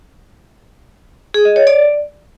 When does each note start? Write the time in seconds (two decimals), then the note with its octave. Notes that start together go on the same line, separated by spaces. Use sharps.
1.34 G#4
1.45 D#5
1.56 C#5
1.67 D5